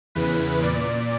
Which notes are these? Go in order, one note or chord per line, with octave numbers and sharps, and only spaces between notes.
E2 C#3 E3 B4
A#2 D5